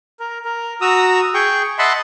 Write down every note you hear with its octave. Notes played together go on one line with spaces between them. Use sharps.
A#4
A#4
F#4 A#5 D#6 E6
G#4 G5 C#6
D#5 E5 F#5 A5 B5 C6